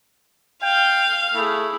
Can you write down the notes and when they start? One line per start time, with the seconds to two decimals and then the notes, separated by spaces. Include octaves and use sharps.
0.63 F5 G5
1.34 A3 E4 G#4